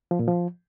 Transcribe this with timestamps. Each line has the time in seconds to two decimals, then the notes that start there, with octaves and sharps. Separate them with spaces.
0.11 F3
0.19 A#2
0.28 F3